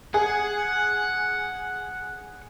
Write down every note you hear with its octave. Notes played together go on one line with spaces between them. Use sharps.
G#4 F#5